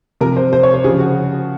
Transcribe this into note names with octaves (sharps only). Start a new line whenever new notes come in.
C3 F3 A#4
C5
C5
C#5
C5
C#3 F3 G#4
F#4